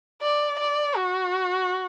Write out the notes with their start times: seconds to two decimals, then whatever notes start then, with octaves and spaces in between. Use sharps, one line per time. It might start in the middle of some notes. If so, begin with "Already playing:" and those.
0.22 D5
0.60 D5
0.97 F#4